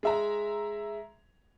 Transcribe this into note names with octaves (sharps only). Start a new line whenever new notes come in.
G#3 E5 A#5